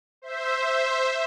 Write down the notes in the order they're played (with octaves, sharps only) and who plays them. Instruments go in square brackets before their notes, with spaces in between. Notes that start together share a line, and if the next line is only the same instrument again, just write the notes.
[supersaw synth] C5 E5